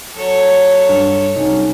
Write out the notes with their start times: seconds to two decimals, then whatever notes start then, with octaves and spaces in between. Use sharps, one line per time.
0.14 F#3 A4 C#5
0.89 G2 D4
1.36 C2 F#3 C#4 D#4